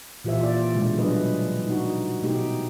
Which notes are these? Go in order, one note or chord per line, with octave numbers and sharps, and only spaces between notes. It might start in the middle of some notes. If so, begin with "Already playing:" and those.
A#2 E3 F4 G4 C5 E5
F4 D5
B2 D3 G#3
D3 F#3 G3 D4 B4 D#5
D#4 F#4
B2 A3 D#4 G4